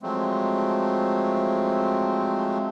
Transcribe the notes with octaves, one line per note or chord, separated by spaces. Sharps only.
F3 F#3 G#3 A3 C4